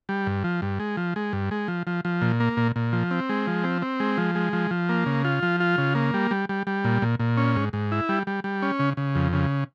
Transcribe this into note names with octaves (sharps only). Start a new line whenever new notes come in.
G3
G2
F3
G2
G#3
F3
G#3
G2
G#3
F3
F3
F3
A#2
A#3
A#2
A#2
F3
C4
G#3
F3
C4
C4
G#3
F3
G#3
F3
F3
A#3
C#3
F4
F3
F4
C#3
A#3
G3
G3
G3
G3
A#2
A#2
A#2
C#4
G#2
G#2
E4
G3
G3
G3
C#4
C#3
C#3
F2
C#3